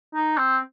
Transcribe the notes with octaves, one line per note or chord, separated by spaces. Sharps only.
D#4
C4